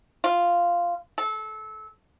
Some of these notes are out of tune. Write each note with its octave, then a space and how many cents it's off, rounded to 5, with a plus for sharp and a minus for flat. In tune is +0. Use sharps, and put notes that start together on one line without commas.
F4 -5
A4 -25